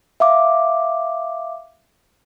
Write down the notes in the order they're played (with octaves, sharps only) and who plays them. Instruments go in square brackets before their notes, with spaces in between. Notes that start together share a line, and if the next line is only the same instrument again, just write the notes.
[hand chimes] E5 F5 D6